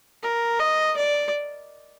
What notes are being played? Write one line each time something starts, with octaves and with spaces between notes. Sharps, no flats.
A#4
D#5
D5